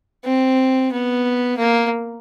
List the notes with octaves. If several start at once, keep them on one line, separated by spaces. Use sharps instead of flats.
C4
B3
A#3